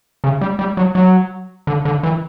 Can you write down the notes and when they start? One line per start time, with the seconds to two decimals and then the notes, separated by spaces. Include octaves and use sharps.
0.24 C#3
0.41 G3
0.59 G3
0.77 F#3
0.95 F#3
1.67 D3
1.85 D3
2.03 E3